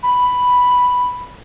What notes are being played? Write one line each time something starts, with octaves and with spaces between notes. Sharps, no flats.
B5